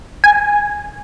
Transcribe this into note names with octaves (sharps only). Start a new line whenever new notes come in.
G#5